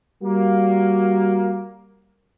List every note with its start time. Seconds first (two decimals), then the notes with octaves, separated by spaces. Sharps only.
0.23 G3 A#3 F#4